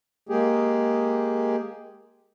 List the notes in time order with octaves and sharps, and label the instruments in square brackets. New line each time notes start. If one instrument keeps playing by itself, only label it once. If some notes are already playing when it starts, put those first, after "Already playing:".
[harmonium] G#3 A#3 G4 G#4